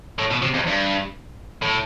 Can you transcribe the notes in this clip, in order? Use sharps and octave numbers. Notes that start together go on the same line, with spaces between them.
A2
B2
C3
F2
G2
A2